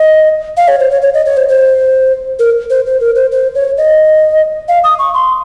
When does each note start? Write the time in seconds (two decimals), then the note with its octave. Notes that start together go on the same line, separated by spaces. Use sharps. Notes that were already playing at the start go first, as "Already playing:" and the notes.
Already playing: D#5
0.57 F5
0.68 C#5
0.80 C5
0.91 C#5
1.02 C#5
1.14 D#5
1.26 C#5
1.37 C5
1.48 C5
2.39 A#4
2.70 C5
2.86 C5
3.00 A#4
3.16 C5
3.32 C5
3.55 C#5
3.77 D#5
4.68 F5
4.84 D#6
4.99 C#6
5.14 C6